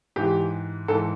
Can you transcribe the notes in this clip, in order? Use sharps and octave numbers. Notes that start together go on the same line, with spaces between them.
G#2 E3 G4
G#2 E3 A4